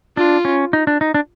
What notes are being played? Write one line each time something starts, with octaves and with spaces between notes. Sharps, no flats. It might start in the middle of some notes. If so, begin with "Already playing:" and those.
D4 F4
C#4
D#4
D4
D#4
D4